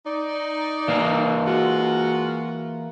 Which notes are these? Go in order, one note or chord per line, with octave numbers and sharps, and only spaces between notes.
D#4 D5
E3 A#3 F5
G#3 F4 F#4